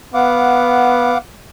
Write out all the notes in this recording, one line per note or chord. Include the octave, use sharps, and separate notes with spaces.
B3 F5 F#5 D6